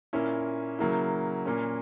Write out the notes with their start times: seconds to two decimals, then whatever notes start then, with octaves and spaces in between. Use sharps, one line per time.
0.13 A#2 A#3 C#4 E4
0.79 C#3 F#3 A#3 E4
1.45 A#2 A#3 C#4